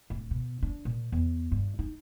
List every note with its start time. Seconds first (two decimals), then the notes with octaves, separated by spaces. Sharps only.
0.10 D1
0.31 B2
0.63 D4
0.85 A#2
1.12 E2
1.52 G2
1.79 D#4